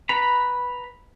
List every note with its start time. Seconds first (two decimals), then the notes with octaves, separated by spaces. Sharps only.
0.09 B4 A#5 B5